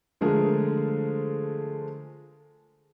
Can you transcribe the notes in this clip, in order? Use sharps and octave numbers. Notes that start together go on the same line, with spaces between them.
D3 F3 G#3 A3 G#4 A#4